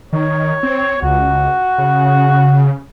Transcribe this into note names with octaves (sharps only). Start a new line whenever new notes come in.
D#3 C#5
C4
C#2 F#4
C#3